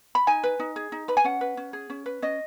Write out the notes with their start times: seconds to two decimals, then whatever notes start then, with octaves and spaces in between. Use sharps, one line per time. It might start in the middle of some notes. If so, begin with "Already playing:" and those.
0.15 B5
0.27 D#4 G#5
0.44 B4
0.60 D#4
0.76 G#4
0.92 D#4
1.08 B4 B5
1.17 G#5
1.24 C#4 F#5
1.41 B4
1.57 C#4
1.73 G#4
1.90 C#4
2.06 B4
2.22 C#4 D#5